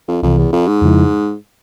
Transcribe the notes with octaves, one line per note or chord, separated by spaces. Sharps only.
F2
C2 F2 C3 E3
E2
F2
G#2
F2 C#3 F3 G#3 E4